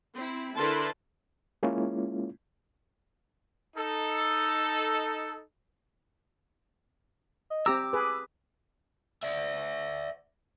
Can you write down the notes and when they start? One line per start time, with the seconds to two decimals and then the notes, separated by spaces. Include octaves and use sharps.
0.15 C4 E4
0.56 D3 E4 A#4 B4 A5 C6
1.63 G#3 A#3 C#4 E4 F4
3.77 D#4 A4
7.50 D#5
7.66 C4 G4 A#5 D6 E6
7.93 G#4 B4
9.23 D5 E5